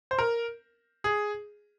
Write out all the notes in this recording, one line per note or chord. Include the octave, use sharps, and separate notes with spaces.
C5
A#4
G#4